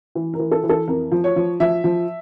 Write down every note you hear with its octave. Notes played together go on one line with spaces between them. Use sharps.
E3
A#4
E3
A4
E3
A4
F2 A#4
F3
C#5
F3
F3 E5
F3